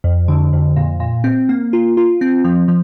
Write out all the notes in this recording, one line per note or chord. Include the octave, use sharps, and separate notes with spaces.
F2
D3
F2
A#2
A#2
C4
A#3
F4
F4
C4
F3
F3